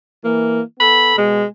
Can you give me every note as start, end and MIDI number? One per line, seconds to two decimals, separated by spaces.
0.25 0.60 52
0.25 0.60 58
0.79 1.13 59
0.79 1.13 69
0.79 1.13 83
1.16 1.45 47
1.16 1.45 56